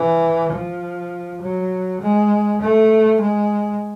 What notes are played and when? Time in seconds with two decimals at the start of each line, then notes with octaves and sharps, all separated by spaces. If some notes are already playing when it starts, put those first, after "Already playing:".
Already playing: E3
0.52 F3
1.41 F#3
2.01 G#3
2.61 A3
3.21 G#3